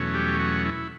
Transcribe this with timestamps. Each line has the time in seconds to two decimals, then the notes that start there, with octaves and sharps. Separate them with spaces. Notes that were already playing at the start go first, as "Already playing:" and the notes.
Already playing: E2 B2 F#3 A3 C#4
0.14 G3 G4
0.39 F#4
0.65 E4